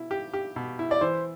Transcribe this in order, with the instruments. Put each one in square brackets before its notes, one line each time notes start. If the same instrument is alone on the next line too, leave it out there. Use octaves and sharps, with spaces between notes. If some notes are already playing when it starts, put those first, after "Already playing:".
Already playing: [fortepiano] B2 E4
G4
G4
B2
E4
[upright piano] D5
[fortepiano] E3 [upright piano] C5